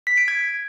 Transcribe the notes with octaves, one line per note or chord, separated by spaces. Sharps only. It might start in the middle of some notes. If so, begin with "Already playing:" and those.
B6
D7
G#6